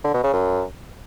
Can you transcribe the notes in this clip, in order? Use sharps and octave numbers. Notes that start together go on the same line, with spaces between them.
D3
B2
C#3
F#2